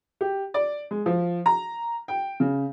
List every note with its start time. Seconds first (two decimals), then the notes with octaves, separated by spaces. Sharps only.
0.21 G4
0.54 D5
0.91 G#3
1.06 F3
1.46 A#5
2.08 G5
2.40 C#3